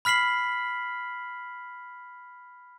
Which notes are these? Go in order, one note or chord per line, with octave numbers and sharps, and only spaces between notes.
B5 F6 B6 C7 F#7